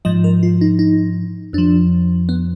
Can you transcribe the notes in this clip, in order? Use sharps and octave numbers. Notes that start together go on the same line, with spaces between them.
G#2 F3 D#5
A#4
F4
D#4
D#4
F2 F3 D4
B3